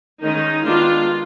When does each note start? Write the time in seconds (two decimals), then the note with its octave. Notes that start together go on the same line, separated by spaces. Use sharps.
0.20 D#3 G#3 C#4 D#4
0.64 D#3 G#3 B3 D4 F4